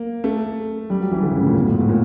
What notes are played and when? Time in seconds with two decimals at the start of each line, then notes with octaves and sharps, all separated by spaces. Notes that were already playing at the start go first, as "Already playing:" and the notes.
Already playing: A#3
0.24 A3
0.90 G3
1.01 F#3
1.11 E3
1.23 D3
1.31 C#3
1.39 A2
1.47 A#2
1.56 B2
1.64 A2
1.72 G#2
1.80 A2
1.89 A#2